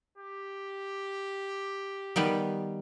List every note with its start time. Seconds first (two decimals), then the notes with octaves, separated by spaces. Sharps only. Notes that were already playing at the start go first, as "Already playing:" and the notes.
0.18 G4
2.16 D#3 G3 B3